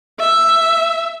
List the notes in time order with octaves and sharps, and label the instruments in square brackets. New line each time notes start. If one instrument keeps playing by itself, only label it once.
[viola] E5